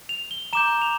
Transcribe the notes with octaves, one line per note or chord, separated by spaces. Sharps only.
F7
G7
A#5 D6 G6 E7
F7